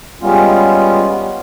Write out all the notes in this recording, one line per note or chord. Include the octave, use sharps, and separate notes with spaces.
G3 G#3 B3 C#4 F4